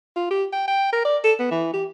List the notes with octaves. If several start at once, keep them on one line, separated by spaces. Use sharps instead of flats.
F4
G4
G5
G5
A#4
D5
A4
B3
E3
G4